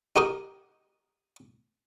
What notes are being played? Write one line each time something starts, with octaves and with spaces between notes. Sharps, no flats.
D#4 F#4 G4 A#4 D#6